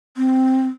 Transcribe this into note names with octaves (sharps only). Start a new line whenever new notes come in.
C4